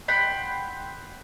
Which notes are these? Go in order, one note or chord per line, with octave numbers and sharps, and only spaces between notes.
F#5 G5 B5 C6